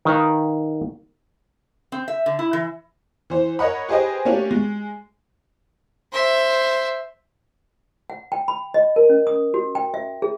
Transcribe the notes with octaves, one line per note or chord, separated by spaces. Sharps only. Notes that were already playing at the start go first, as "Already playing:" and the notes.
D#3 B4 F5
C4
E5
D3
E4
E3
E3 C5
A#4 C#5 D#5 F#5 B5
G4 G#4 B4 C5 D#5 G5
A3 A#3 C#4 D4 F#4 G4
G#3
C5 E5
F#5
G5
B5
D#5
A#4
C#4
D#6
F#4
G5
E5
G#4